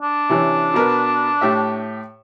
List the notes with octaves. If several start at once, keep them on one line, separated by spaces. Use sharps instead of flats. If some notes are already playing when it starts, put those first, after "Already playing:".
D4
C3 E3 C#4
B2 A#4 B4
A2 G4 E5